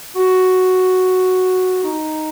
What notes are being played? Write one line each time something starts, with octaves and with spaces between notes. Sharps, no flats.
F#4
D#4